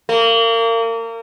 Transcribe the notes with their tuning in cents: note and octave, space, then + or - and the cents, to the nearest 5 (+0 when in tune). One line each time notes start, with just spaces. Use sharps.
A#3 -30